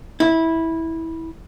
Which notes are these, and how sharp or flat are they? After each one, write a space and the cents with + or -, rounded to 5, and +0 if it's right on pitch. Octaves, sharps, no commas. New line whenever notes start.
E4 -15